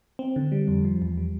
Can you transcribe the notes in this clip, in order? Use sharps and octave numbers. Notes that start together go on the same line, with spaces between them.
C4
D3
G3
F2
F3
E2
G3